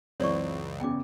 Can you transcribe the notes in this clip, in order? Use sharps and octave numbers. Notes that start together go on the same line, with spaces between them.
C#2 F#2 E3 C4 C#5 D5 C#6
E2 C#3 G5 D6